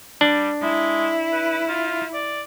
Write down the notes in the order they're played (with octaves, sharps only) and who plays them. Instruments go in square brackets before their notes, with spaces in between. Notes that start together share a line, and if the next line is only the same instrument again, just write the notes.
[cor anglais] G3 [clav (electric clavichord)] D4
[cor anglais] G#3 [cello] E4
[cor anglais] B4
F4
D5